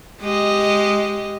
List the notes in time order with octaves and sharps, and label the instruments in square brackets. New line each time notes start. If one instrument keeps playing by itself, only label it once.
[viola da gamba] G#3 G4 D#5